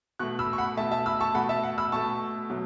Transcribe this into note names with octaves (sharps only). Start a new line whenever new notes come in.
B2 A3 C#6 F#6
B5 E6
C#6
F#5 B5
B2 A3 E5 A5
E5 A5
B5 E6
A5 C#6
B2 A3 F#5 B5
E5 A5
F#5
B5 E6
B2 A3 A5 C#6
B2 F#3 A3